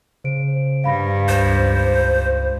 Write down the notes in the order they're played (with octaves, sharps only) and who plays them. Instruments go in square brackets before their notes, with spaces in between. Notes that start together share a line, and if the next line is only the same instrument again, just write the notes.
[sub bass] C#3 [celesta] C5 D7
[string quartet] G2 [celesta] F5 B5 A#6
[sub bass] C#2 [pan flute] C5